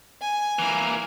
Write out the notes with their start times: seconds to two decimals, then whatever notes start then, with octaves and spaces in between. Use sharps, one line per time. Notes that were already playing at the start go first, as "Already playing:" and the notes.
0.22 G#5
0.59 E3 A#3